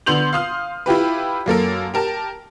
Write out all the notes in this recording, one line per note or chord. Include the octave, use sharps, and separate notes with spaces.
D3 B3 C6 G6 F7 F#7
F5 C6 D#6 F6
E4 F4 G4 B4
F#2 A#3 A4 A#4
G4 A#4 A5